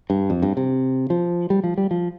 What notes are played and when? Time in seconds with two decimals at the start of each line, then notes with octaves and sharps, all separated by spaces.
0.10 G2
0.30 F2
0.42 G2
0.57 C3
1.10 F3
1.50 G3
1.64 F3
1.78 G3
1.91 F3